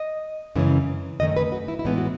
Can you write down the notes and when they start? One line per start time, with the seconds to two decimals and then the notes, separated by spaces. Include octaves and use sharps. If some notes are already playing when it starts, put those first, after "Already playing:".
Already playing: D#5
0.55 F#2 C#3 E3 G#3 C#4
1.20 F#2 D#3 A3 C#4 D#5
1.37 B4
1.52 F#4
1.68 E4
1.79 E4
1.85 A2 E3 G#3 B3 D#4
1.98 F#4